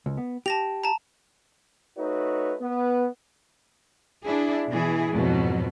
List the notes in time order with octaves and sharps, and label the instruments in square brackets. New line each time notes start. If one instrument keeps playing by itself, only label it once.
[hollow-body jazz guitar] C#2
B3
[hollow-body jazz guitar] G4 [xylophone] A5 A#6 F7
[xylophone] A5 A#5
[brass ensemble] A3 D#4 F#4 B4 C#5
B3
[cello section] D4 E4 G#4
B2 E3 E4 G#4
F2 G#2 B2 F#3